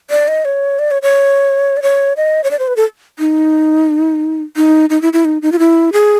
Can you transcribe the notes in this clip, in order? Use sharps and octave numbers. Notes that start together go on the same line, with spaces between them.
D5
D#5
C#5
D5
C#5
C#5
D5
C#5
D#5
C#5
D5
C5
B4
A4
D#4
D#4
D#4
E4
E4
D#4
D#4
F4
E4
G#4